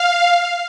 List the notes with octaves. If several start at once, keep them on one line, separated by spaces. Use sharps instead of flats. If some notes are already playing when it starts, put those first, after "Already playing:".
Already playing: F5